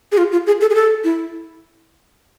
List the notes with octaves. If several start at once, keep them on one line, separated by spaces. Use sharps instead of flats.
G#4
F4
F4
G#4
A4
G#4
A4
E4